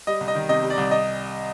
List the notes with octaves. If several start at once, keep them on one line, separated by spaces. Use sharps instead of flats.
G3 D#5
C2
D#5
D#3
C3 D#5
G3
D5
C2
D#5